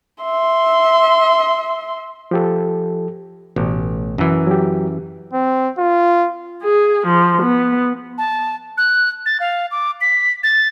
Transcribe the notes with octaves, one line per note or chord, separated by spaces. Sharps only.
E5 C6
F3 G4 A4
A1 B2
F#2 E3
F#3 G4
C4
F4
G#4
F3
B3
A5
F#6
A6
F5
D6
B6
A6